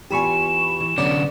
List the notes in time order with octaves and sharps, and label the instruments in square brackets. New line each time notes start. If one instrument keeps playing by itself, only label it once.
[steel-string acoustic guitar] E2 F4 G#5 [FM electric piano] G4 B5 C#6 [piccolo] E7
[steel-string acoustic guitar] E3
[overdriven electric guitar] D3 C#4 [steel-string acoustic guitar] F#3 B3 C#5 [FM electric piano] D5